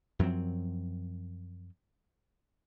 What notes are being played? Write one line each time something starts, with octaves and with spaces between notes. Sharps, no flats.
F#2 F3 F#3 C4